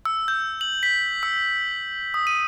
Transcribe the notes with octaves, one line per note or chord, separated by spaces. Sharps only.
E6
G6
F#7
B6
E6
D#6
D#7